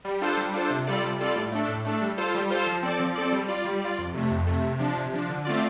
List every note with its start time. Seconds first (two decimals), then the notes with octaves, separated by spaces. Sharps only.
0.05 G3
0.21 D4 F4 A4 C5
0.37 G3
0.54 D4 F4 A4 C5
0.70 C3
0.87 G3 F4 A4 D5
1.04 C3
1.19 G3 F4 A4 D5
1.36 A2
1.52 A3 D4 A4
1.69 A2
1.85 A3 D4 A4
2.01 G3
2.18 F4 A4 C5
2.35 G3
2.50 F4 A4 C5
2.67 F3
2.83 C4 A4 D5
3.00 F3
3.16 C4 A4 D5
3.32 G3
3.48 F4 D5
3.65 G3
3.81 F4 D5
3.98 F2
4.14 C3 A3
4.31 F2
4.47 C3 A3
4.64 C3
4.79 F3 D4
4.97 C3
5.13 F3 D4
5.29 D3
5.45 A3 C4 F4 D5